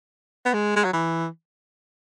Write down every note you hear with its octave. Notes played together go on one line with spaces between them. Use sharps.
B3
G#3
G#3
F#3
E3